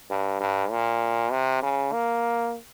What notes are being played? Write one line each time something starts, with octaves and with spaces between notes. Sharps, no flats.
G2
G2
A#2
C3
C#3
A#3